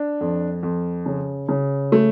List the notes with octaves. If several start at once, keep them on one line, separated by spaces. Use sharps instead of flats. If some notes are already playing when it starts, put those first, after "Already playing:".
Already playing: D4
F2
F2
C#3
C#3
A3